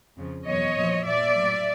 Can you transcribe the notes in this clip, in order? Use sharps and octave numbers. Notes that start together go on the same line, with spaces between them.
F2 C#3 F3
E2 B2 F#3 C#5 D#5
A#2 F3
A#2 F3 D5 E5
A2 F#3